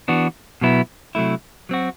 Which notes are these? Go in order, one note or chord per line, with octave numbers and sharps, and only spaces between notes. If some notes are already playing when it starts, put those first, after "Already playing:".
E3 B3 D4 F#4
B2 F#3 B3 E4
C3 F#3 A3 E4
F#3 C4 F#4